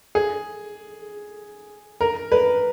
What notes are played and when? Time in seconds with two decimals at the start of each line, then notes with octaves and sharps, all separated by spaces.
0.15 G#4
2.01 A#4
2.32 B4